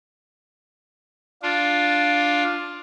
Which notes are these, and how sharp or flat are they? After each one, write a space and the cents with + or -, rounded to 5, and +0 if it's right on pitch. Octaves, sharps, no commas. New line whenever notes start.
D4 +0 F4 +5